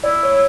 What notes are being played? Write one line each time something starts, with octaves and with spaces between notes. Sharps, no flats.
E4 D5
C#5
E4